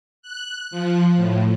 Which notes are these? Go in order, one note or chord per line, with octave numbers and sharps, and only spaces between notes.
F#6
F3
A2